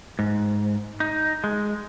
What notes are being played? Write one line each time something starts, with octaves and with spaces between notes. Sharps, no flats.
G#2
D#4
G#3